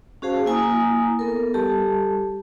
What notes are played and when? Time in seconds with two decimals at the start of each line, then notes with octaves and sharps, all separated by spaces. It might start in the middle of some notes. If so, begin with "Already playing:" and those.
0.22 C#4 F#4 G#4 C5 F5 A5
0.45 A#3 E4 G#5 A#5 D#6
1.19 B3 A4 A#4
1.54 G3 G4 A4 A5